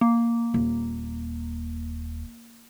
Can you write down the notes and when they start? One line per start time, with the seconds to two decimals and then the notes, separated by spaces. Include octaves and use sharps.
0.01 A#3
0.54 D#1